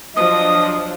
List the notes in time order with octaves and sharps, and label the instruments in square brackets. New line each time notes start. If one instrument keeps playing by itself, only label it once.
[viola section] F3 F#3 D4 [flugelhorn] D#5 [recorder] D#6